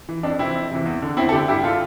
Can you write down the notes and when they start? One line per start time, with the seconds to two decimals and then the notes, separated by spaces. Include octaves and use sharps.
0.09 E3
0.23 F2 D4
0.39 C3 E3 C4 E4
0.55 F2
0.71 C3 E3
0.86 E2
1.02 D3
1.17 E2 C4 E4
1.29 A4
1.32 D3 E4 G4
1.48 G2 E4 G4
1.64 D3 F4 A4